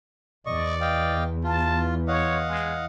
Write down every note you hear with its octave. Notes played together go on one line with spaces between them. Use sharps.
E2 D5 D#5 C#6
D#5 F5 G5
F4 A5
C#5 D#5 F5 F#5
G#3